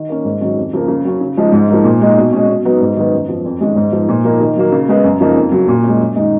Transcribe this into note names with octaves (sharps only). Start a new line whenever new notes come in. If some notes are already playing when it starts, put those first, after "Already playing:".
Already playing: D#3
A#3 C#4
G#2
D#3 F#3 C#4
F2
C#3 F3 A#3
C#3
F#3 C#4
C#3
F3 G#3 D#4
G#2
F3 A#3 D#4
A#2
G#3 D#4
B2
G#3 C#4
B2
F#3 B3 D#4
G#2
D#3 F#3 B3 D#4
F#2
F3 B3
F2
D#3 G#3 C#4
G#2
F3 B3 D#4
A#2
F3 A#3 D#4
D#3
F#3 A#3
C#3
G#3 B3
F#2
C#3 F3 A#3 D#4
F2
C#3 F#3
A#2
G#3 C#4
F#2
D#3 G#3 D#4